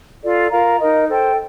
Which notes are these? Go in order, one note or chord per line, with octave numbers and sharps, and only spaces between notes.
F4 A4 D5
F4 A#4 F5 A#5
D#4 A#4 D#5
A4 C5 G5